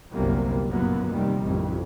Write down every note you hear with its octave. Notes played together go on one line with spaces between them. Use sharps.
G1 C2 F#2 C3 G3 A#3
F#1 F#2 A#2 F#3 A#3 B3
F1 C3 D#3 G3
A1 F2 C3